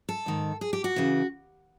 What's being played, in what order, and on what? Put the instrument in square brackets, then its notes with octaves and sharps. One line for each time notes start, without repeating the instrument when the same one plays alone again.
[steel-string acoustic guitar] A4
G#2 D#3
G#4
G4
F#4
C#3 E3